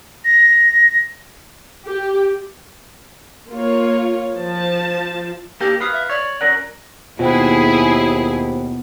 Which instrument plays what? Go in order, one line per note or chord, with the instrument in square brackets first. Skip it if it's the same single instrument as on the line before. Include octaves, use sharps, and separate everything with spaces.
[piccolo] A#6
[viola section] G4
A#3 F4 C#5
F3 A5
[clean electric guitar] A#3 D4 G5 [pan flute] G4
[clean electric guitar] B4 F5 [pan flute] D#6
[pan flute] E5
[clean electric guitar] C#5 [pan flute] D5
[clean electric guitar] C#4 A#4 F#5
[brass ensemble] D#2 [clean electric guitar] B2 [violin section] E4 G#4 [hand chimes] F4 C5 G5